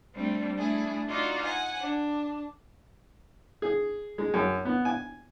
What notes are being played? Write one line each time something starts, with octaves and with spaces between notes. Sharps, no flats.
G3 A3 C4 D4
A3 D4 E4 G#4
D#4 F4 F#4 D5
F#5 G#5
D4
G#4
G#3
F#2
B3
G#5